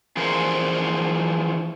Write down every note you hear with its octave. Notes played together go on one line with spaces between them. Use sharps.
E3 F3 G#4 A#4 C5